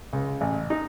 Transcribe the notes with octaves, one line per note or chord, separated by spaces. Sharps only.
C#2
A1
D#4